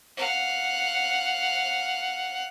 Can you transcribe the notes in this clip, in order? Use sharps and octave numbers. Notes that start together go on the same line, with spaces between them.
F5 F#5